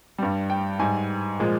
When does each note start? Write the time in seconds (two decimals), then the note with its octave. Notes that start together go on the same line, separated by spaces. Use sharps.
0.18 G2 G3
0.50 G5
0.79 G#2 G3 G#5
1.40 A#2 F3 G#3